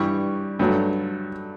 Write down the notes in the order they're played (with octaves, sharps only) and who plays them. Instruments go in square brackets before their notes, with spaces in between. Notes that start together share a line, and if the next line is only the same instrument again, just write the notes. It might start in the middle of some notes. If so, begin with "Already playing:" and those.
Already playing: [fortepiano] G2 E3 G3 C#6
G2 F#3 A3